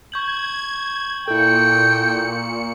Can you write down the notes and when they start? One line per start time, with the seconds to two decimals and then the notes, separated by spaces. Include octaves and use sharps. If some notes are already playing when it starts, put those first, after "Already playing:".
0.12 C#6 G6 G#6 F#7
1.28 A#2 E4 A4 G5 C#7